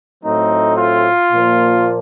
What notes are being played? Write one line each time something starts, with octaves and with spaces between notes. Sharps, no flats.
A2 F#3 A3 C4 D#4
F4
A#2 F3 A#3